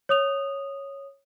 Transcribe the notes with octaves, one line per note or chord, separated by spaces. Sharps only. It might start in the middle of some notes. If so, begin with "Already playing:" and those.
C#5 D#6 F7